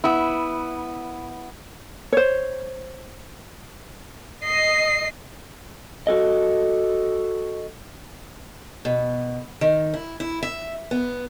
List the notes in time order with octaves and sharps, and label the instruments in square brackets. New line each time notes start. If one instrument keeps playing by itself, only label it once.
[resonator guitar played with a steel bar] B3 E4
[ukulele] C5 C#5
[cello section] D#5 [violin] C7
[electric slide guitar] F#4 A4 D#5
[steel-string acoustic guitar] B2
D#3
E4
E4
E5
B3